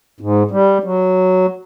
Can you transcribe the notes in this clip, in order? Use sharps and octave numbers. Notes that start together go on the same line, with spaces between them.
G#2
G3
F#3